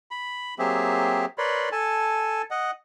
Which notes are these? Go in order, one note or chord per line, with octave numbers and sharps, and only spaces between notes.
B5
F#3 A#3 C4 G4 G#4 E5
A#4 B4 C#5 D5 B5 C6
A4 G#5 A5
D#5 F#5